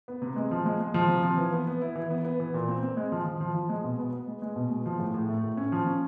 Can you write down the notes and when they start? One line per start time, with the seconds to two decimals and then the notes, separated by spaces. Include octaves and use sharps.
0.08 B3
0.22 C3
0.36 G#3
0.51 F3
0.66 G#3
0.80 G#3
0.94 F3
1.09 C3
1.23 F3
1.38 E3
1.53 B3
1.67 B3
1.81 E4
1.95 E3
2.10 B3
2.24 B3
2.40 E3
2.54 A#2
2.68 C4
2.82 C4
2.97 G#3
3.12 F3
3.26 F3
3.41 F3
3.55 F3
3.69 G#3
3.84 B2
3.99 B3
4.13 B3
4.27 G#3
4.42 G#3
4.56 B2
4.71 G#3
4.86 F3
5.00 A2
5.14 A2
5.29 A3
5.44 A2
5.57 C#4
5.72 F3
5.87 C#4